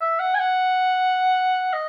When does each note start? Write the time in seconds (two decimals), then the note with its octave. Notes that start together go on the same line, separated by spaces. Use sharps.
0.01 E5
0.19 F#5
0.35 G#5
0.39 F#5
1.73 D#5